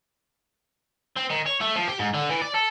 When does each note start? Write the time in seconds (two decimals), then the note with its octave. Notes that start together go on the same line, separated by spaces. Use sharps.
1.16 C4
1.30 D#3
1.46 C#5
1.61 A3
1.76 F3
1.88 G4
1.99 G#2
2.14 D3
2.29 E3
2.41 D5
2.54 A4